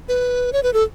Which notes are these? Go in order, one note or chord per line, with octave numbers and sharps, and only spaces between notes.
B4
C#5
B4
A4